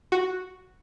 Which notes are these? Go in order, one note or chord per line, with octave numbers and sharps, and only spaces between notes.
F#4